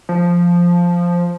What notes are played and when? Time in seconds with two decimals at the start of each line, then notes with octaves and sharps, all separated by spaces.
0.09 F3